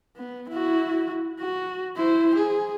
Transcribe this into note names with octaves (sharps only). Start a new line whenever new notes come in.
B3
E4 F#4
F#4
E4 C5
G#4